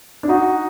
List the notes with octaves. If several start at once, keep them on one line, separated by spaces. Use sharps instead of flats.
D4
D#4 F#4